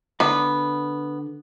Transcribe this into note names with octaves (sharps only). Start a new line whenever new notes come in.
D3 B3 D5 A#5